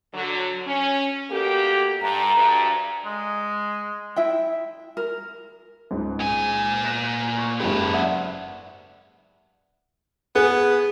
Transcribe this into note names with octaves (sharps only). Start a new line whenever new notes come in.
D3 F#3
C#4
B2 A#3 G4 A4
G2 A#5
D2 G2
G#3
E4 E5 G5
A#4
C#2 G#2
A#2 G#5
F#6 A#6 E7
C#6
F#1 G#2 A#3 G4 B4
D5 E5 F#5
B3 G#4